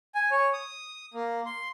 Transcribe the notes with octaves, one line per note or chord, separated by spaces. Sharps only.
G#5
C#5
D#6
A#3
C6